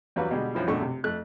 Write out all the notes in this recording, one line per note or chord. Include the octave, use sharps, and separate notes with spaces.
E2 F#3 G3 B4 F5
B2 D3 G3 G#3
F#2 F3 E4
G#1 F#2 B2 A3 D4 C#6
C3
F2 A3 F#6